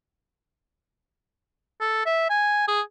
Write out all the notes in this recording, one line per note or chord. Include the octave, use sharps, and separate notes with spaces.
A4
E5
G#5
G#4